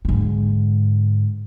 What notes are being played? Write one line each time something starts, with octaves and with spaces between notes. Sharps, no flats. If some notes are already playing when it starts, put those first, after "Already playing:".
G#2 D3